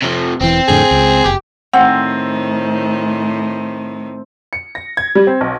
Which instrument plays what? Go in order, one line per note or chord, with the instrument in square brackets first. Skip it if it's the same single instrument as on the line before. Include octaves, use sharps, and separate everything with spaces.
[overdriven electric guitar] C3 F3
[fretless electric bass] E1 E3 [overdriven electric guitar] C4
[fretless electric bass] F2 A2 D3 [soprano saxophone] G#4
[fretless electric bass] C#2
[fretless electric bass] F#1 [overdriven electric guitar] G4
[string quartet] A2 D#3 [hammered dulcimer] C4 [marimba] F#5
[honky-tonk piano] C#7
A#6
G#6
G3
C4
B1